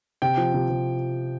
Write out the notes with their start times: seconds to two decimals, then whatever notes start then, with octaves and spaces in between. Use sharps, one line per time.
0.22 C3 G5
0.37 F3
0.54 C3
0.69 C3